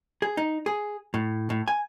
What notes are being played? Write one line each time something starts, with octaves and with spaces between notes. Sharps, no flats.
G#4
D#4
G#4
A2
A2
G#5